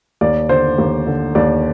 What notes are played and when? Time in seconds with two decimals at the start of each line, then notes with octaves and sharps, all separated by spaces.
0.21 D#2 D5
0.49 D3 C5
0.78 D#2
1.07 D3
1.35 D#2 D5